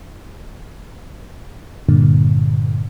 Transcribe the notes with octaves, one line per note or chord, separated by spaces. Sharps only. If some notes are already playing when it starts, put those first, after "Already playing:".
G2 A#2 D3